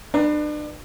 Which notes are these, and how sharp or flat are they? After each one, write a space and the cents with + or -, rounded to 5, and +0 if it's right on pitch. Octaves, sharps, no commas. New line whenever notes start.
D4 +35 B4 +0 A#5 +15